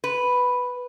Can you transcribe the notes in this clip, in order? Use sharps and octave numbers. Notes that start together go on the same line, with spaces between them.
B4